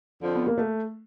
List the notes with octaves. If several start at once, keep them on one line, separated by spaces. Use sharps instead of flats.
F2 D3 F3
B3
A#3
A3